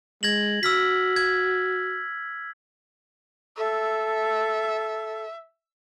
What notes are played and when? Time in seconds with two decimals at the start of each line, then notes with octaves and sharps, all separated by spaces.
0.23 G#3 G#6 A#6 F#7
0.63 F#4 E6 F6 B6
1.16 G#6
3.57 A4 E5